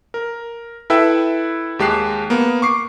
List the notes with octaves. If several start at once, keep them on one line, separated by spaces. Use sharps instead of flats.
A#4
E4 A4 B4 E5 G5 E6
D#2 G#3 G4 A5 F#6 C7
A#3 B3
C#6 D6 C7